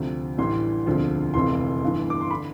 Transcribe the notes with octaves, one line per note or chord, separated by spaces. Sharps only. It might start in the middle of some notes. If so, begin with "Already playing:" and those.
Already playing: D2 C3 F3
A1 A2 E3 G3 D4 C6
E1 D2 D3 F3 C4
F1 F2 C3 E3 C6
G1 G2 E3
D6
C6
D3 B5